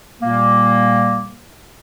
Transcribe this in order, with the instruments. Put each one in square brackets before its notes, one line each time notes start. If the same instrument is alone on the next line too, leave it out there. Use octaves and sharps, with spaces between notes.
[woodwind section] A#2 G3 A#3